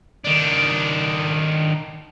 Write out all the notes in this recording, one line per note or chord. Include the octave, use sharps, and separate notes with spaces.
D#3 D4